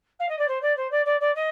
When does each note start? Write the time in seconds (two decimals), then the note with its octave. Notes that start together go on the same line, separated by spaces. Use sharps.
0.19 F5
0.28 D#5
0.38 D5
0.48 C5
0.62 D5
0.76 C5
0.91 D5
1.05 D5
1.20 D5
1.35 D#5